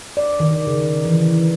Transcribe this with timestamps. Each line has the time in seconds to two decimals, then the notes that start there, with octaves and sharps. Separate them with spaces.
0.17 D5
0.40 D#3
0.67 C#3
1.05 E3